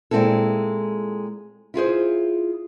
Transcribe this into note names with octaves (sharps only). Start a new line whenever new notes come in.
A#2 G#3 A#3 C4 E4 A4
E4 F4 G#4 C5